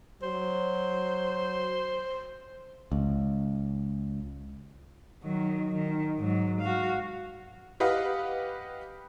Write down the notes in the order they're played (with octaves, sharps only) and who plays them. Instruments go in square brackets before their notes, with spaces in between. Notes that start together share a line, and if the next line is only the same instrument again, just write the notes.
[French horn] F#3 [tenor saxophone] C5
[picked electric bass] C#2
[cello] D#3 F#3
D#3
G#2 F#3
F#4 F5
[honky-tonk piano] G4 B4 D#5 F5 F#5